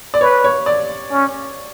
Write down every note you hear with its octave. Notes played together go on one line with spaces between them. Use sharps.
D5
B4 C#5
C#5
D5
C#4